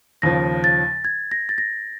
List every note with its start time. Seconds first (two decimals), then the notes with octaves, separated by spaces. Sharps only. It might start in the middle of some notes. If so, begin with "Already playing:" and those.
0.22 D#2 C#3 F3 A#6
0.64 A6
1.05 G#6
1.31 A#6
1.49 A6
1.58 A#6